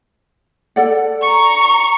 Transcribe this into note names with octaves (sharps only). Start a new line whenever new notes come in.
A4 D5 F#5
A#5 C#6